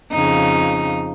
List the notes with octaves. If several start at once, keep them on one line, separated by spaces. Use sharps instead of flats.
F2 C#3 D#4